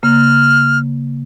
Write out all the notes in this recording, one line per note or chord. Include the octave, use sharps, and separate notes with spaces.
C#3 A#3 F6